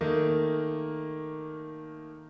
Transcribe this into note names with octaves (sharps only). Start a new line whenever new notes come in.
D#3 A3 A#3